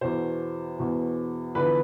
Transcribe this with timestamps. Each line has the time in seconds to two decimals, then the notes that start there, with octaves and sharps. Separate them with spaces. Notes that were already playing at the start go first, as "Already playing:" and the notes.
0.01 E2 B2 C5
0.78 E2 B2
1.55 E2 D3 F3 B4